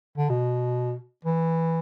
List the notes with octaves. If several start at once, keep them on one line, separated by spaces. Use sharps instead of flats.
D3
B2
E3